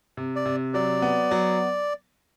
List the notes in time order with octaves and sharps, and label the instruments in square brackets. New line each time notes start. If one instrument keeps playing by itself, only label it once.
[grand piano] C3
[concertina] D5
[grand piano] C3
[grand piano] F#3 [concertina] D5
[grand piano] B3
F#3